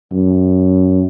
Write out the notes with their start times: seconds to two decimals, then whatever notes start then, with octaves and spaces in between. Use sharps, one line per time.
0.12 F#2